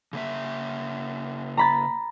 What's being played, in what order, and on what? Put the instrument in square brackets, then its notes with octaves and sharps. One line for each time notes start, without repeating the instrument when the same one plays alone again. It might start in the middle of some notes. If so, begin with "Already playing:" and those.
[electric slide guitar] C#3 A#3 E5
[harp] A#5 B5 A6